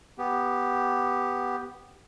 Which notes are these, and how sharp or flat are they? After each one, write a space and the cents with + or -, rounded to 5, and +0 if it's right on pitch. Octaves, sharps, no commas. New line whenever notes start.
B3 +0 G4 +0